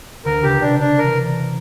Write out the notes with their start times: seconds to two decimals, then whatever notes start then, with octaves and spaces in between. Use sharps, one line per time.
0.25 D2 D3 A#4
0.43 C#2 C#3 G4
0.61 C3 D4
0.79 D4
0.98 A#4
1.04 E3